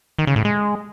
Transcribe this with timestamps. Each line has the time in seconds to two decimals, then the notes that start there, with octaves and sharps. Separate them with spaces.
0.19 D#3
0.27 C#3
0.36 A2
0.45 G#3